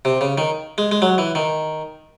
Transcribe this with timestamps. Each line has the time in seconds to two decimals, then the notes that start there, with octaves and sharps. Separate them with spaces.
0.05 C3
0.21 C#3
0.38 D#3
0.78 G#3
0.92 G#3
1.02 F#3
1.18 E3
1.35 D#3